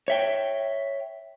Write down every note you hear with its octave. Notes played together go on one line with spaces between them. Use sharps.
C#5 E5 G5